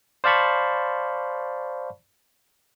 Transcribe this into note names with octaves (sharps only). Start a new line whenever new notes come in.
C5 D5 F5 A5 B5 C#6